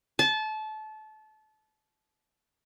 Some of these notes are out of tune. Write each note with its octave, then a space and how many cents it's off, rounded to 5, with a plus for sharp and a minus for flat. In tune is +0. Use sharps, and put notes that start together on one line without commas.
A5 -25